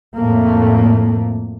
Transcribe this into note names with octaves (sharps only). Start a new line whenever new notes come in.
F2 A2 A3 A#3